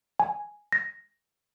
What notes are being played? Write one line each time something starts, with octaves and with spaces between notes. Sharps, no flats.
G#5
A#6